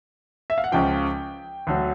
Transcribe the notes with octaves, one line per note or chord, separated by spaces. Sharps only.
E5
F5
F#5
C#2 C#3 F3 G5
D2 D3 F#3